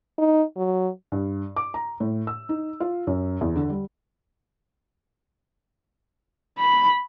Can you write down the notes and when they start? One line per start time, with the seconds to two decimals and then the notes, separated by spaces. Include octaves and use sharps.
0.18 D#4
0.57 F#3
1.12 G2
1.56 D6
1.74 A#5
2.00 A2
2.27 E6
2.49 D#4
2.80 F4
3.07 F#2
3.41 E2
3.56 D3
3.70 G3
6.59 B5